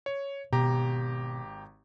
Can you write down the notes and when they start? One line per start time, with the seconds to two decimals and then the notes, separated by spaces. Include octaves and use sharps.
0.06 C#5
0.52 G#1 B2 G4 A#5